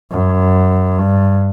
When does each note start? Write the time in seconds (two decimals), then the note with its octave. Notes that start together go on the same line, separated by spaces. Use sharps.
0.11 F#2
0.98 G2